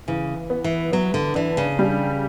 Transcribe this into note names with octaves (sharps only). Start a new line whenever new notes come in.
C#3 E3
B3
E3
F#3 B3
D3
E3 D4
C#3
G3